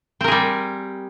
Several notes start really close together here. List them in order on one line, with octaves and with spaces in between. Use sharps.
C4 A#4 G#4 G3